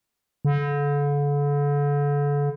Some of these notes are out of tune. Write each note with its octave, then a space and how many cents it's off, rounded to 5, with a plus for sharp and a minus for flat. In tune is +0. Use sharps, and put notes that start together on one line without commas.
D3 -35